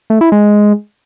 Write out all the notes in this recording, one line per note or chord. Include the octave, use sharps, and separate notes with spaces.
A3
E4
G#3